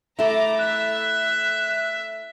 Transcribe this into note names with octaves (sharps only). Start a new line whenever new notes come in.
A3 E4 A#5 D6
E5 F#6